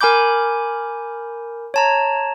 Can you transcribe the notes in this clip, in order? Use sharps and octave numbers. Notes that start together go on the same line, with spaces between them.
A#4 G#5 B5 D6 G6
C#5 A5 A#5